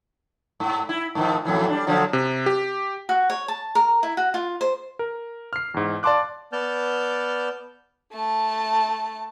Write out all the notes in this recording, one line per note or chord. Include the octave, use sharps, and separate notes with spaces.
G#2
E4
G#2 D#3 F3
F2 A2 E3
G3 D4
D3 F3 F#3
C3
G4
F#4
C#5
A5
A#4
E4
F#4
F4
C5
A#4
F6 C7
E2 G#2
D5 F5 A5 C6 D6 F#6
B3 D5 A5 F6 G6
A3 A5